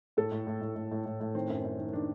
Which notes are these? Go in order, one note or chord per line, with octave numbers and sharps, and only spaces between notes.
A2 A4
A2
A2
A2
A2
A2
A2
A2
D#3 C4
F#2
F#2
D#3
D#3 D4